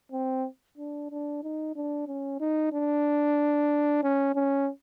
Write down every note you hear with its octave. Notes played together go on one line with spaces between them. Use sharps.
C4
D4
D4
D#4
D4
C#4
D#4
D4
C#4
C#4